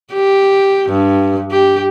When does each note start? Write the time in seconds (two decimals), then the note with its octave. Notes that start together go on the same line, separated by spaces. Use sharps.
0.13 G4
0.89 G2
1.51 G4